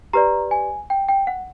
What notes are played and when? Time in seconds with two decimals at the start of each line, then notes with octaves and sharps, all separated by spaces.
0.13 G4 B4 D5 A#5
0.51 G#5
0.90 G5
1.09 G5
1.27 F#5